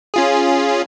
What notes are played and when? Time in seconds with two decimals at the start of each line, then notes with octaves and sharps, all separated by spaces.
0.14 C#4 F4 G#4